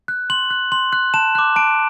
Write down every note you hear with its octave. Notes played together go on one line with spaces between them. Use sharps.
F#6
C6 F#7
F#6
C6 F#7
F#6
A5 E7
D6 F#6
A5 D7